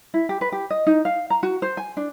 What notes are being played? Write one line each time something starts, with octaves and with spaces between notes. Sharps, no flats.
E4
G4
B4
G4
D#5
D#4
F5
A#5
F#4
C5
G#5
D4